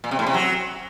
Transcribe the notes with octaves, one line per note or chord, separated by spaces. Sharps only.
A#2
C3
A2
C3
F#3